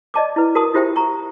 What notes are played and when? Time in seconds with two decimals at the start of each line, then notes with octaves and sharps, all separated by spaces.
0.14 D5 D#5 A5 D6
0.36 E4 B4
0.55 F#4 A#4 A5 C6 D#6
0.74 E4 F4 G4 C5 E5 G5
0.96 A#5 C#6